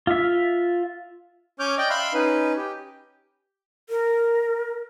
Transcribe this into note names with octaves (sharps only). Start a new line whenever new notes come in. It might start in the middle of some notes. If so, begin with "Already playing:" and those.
F4 E5
C#4 C#5 D6 F6 G6
D5 D#5 G5
E5 F5 B5 C6 F#6
C#4 D#4 B4
G4
A#4